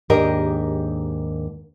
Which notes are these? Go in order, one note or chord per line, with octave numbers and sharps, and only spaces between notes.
D#2 G#2 D4 G4 A#4 D#5